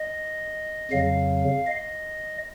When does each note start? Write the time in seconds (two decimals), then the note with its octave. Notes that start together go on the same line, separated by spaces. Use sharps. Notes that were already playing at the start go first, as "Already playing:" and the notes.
Already playing: D#5
0.91 F2 C#3 F#3 F5
1.67 D#5